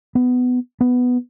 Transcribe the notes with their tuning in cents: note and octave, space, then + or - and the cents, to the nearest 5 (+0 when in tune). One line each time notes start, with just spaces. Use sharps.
B3 +15
B3 +5